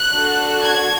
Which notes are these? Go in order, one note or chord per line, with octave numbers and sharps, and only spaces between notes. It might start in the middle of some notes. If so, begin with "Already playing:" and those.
Already playing: F#6
D4 F#4 A4
G#6